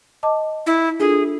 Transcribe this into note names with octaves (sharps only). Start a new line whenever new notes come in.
D#5 A5 D6
E4
D4 F4 G#4 A4